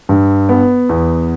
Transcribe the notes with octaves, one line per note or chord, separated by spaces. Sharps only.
G2
B3
E2